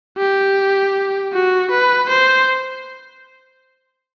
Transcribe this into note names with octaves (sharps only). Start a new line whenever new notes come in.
G4
F#4
B4
C5